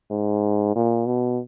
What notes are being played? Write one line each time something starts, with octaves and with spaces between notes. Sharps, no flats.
G#2
A#2
B2